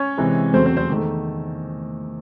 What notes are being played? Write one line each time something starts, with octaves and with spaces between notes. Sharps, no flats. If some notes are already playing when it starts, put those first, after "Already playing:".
Already playing: C#4 C#5
C3 E3 G#3
E2 C#3 F#3 A3 C4 C5
C4 C5
C4 C5
E2 D#3 A3